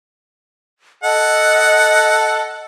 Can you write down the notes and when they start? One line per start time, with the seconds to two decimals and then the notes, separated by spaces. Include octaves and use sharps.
1.03 A4 D#5 F#5